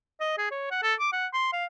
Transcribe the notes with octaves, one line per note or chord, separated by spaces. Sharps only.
D#5
G#4
C#5
F#5
A4
D6
F#5
C6
F5